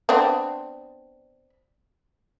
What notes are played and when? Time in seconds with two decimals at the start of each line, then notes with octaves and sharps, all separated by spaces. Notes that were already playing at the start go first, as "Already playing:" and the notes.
0.09 B3 C4 D4